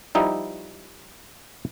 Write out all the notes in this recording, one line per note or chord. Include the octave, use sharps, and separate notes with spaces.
F3 G3 D#4 E4